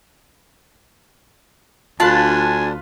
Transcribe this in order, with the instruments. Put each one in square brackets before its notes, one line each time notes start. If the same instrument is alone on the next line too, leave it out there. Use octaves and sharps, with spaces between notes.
[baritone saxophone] D2 [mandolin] D4 A5 [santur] F4 B4 [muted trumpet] G#5